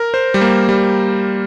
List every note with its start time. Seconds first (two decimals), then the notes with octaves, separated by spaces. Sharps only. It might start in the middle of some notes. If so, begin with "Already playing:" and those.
Already playing: A#4
0.14 C5
0.34 G3
0.41 A#3
0.69 G3